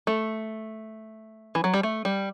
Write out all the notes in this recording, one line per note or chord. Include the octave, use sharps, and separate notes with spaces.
A3
E3
F#3
G3
A3
G3